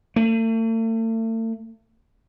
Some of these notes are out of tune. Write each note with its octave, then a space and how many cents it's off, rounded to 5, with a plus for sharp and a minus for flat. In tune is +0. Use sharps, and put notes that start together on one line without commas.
A3 +40